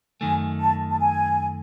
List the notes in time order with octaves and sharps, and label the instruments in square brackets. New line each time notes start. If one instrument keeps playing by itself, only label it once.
[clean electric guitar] F#2 D#3 A3 [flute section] G#5
[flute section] A5
A5
G#5